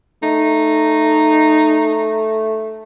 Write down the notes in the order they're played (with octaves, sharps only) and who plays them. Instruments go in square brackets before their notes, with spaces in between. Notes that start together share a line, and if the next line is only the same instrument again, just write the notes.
[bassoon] A3 [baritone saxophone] D#4